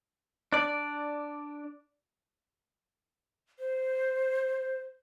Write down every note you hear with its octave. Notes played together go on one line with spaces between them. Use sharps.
D4 D5
C5